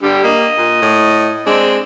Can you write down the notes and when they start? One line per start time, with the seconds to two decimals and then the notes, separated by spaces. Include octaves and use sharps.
0.02 D3 G3 G4
0.24 A#3 D#5
0.58 A#2
0.82 A2
1.46 G#3 C4 D4